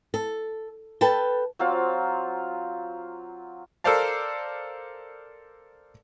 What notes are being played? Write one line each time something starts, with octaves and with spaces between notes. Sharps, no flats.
A4
A4 B4 G5 A5
F#3 C4 F4 F5
A4 A#4 C5 D5 F5 A5